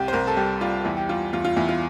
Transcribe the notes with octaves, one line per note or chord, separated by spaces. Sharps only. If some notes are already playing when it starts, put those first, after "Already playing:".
Already playing: C2 G4
C5
C2 A#4
A4
G3 G4
G3 F4
E2 E4
G4
G3 F4
E2 F4
F4
E2 E4
F4